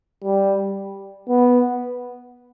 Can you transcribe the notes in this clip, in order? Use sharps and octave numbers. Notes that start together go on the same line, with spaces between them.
G3
B3